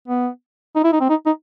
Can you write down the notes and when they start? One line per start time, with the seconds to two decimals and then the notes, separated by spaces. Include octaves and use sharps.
0.08 B3
0.76 D#4
0.84 E4
0.92 D#4
1.01 C4
1.10 D#4
1.26 D#4